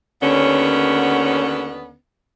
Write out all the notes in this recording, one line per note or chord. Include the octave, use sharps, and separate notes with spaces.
D#2 D3 B3 C#4